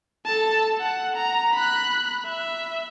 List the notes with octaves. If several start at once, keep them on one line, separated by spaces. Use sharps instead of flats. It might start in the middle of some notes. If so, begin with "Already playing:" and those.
A4 A5
F#5
A#5
B5 F#6
E5